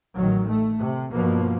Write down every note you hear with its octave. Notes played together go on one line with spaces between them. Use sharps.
A1 D#3 F#3
A3
C3
G2 B2 F3 A#3